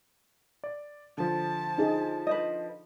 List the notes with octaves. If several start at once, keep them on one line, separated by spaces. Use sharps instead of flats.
D5
D3 F3 A5
D4 D#4 G#4
B4 C5 D#5